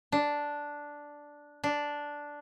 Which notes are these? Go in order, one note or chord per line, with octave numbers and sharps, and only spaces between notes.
D4
D4